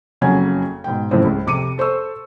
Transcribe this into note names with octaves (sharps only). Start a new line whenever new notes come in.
F#1 F2 C#3 F#3 G#5 G#6
G#2 B2 G5
F#2 A2 C#3 F3 C4
C#2
F2 C3 D6 C#7 D#7
A4 C5 C#6 E6